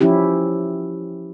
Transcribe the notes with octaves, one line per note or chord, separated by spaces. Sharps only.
F3 C#4 E4 G4